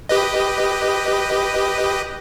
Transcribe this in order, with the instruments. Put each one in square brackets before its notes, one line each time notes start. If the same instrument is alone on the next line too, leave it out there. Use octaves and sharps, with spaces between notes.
[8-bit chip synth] G4 B4 D#5